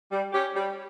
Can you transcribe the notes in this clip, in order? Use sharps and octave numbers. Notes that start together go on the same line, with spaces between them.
G3
C#4 G4
G3